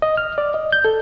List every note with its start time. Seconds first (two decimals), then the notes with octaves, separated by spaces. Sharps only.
0.02 D#5
0.17 F6
0.38 D5
0.54 D#5
0.72 G6
0.85 A4